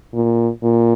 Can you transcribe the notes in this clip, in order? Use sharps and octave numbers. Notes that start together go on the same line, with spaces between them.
A#2
A#2